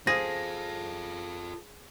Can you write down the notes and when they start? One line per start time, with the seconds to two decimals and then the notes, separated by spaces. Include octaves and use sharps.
0.07 F4 G#4 A4 C5 F5 A#6